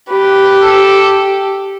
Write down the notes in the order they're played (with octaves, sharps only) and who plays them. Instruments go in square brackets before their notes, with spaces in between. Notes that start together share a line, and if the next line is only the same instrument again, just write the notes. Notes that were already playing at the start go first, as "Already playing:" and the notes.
[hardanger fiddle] G4 [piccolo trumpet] B4
[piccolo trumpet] A4